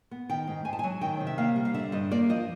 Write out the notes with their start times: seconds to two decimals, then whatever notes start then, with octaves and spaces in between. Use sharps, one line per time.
0.11 B3
0.29 D#3 G5
0.47 G#2
0.65 G#2 G#5
0.73 A5
0.79 G#5
0.84 F#3
1.01 D#3 G5
1.20 C3
1.27 E5
1.38 A#3 F5
1.56 G3
1.65 F5
1.74 D3 E5
1.92 G2 D#5
2.11 A#3 D5
2.29 F3 D#5